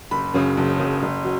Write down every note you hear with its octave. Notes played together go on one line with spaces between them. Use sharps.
F#1 B5
F#2 C#3
F#1
F#2 C#3
F#1
F#3